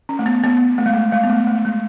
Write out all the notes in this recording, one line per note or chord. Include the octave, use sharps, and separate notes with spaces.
C#4
A3
B3
B3
A3
G#3
A3
G#3
B3
A3
A3
G#3